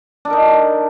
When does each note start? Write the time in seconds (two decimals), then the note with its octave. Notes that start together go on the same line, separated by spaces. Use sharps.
0.25 D4
0.28 A4
0.30 A#4
0.33 D#4